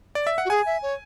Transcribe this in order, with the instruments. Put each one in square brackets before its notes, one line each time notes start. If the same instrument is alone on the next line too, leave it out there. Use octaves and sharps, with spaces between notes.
[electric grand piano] D5
E5
F#5
[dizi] F#4
[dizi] G#4 [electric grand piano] G#5
[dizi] E5
C#5